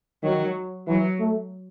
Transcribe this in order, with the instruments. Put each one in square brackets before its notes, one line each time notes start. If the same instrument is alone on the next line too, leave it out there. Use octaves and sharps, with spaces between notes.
[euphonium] D#3 [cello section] F#3
[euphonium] E3 [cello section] F#3
[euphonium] A3